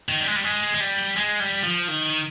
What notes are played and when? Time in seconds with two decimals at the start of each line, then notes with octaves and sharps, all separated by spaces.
0.09 D#3
0.21 G3
0.27 G#3
0.36 G3
0.44 G#3
0.74 G#3
0.80 G3
1.16 G#3
1.40 G3
1.63 F3
1.88 D#3